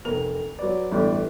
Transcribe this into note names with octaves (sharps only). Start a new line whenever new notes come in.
F1 A#4 F7
F#3 B4 D5
G1 A2 E3 G4 D5